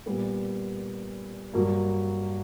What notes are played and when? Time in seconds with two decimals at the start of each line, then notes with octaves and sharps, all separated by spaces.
0.06 A#2 G3 B3
1.54 G2 F#3 A#3